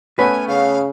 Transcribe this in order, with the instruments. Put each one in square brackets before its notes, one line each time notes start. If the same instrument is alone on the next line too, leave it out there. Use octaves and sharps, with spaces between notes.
[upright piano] A3 B3 C#4 [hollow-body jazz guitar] B4 [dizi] G#5
[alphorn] C#3 [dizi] F5